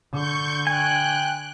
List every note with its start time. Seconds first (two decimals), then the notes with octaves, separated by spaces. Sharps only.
0.12 D3 C#6 G6
0.67 G5 G#5 F#6